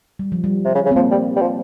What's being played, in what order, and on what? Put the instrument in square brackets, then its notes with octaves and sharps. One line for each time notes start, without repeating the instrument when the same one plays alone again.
[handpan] G3
F3
G3
[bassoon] C3
C#3
C#3
[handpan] C4
[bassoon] F3 [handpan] A#3
[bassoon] G3
G3
F3